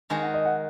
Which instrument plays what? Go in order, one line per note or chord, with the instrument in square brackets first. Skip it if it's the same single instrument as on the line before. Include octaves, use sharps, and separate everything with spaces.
[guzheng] D#3 G#3 F#4 [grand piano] G#5
[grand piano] F#5
D#5
F#5